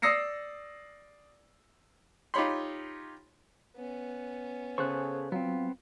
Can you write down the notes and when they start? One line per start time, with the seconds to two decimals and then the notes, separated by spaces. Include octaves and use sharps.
0.02 D5 D#6 E6 A#6 C7 C#7
2.34 D#4 F4 G4 C#5 B5 C6
3.76 B3 C#4
4.78 C#3 G#4 A4 C5 C#6 F#6
5.32 F#3 B3 C4 F4